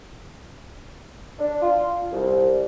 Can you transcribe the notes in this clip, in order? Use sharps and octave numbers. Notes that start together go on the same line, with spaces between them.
D4
F4
C2